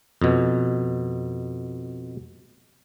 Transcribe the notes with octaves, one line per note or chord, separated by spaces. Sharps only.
F2 B2